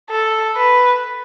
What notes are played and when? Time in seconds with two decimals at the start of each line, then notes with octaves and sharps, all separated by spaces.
0.10 A4
0.56 B4